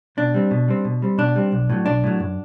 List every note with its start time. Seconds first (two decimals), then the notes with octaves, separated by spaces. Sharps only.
0.17 B2 D4
0.34 G3 C4
0.51 B2
0.68 G3 C4
0.85 B2
1.02 G3 C4
1.18 B2 D4
1.36 G3 C4
1.52 B1
1.70 A2 F#3
1.86 B1 D4
2.04 A2 F#3
2.20 F#2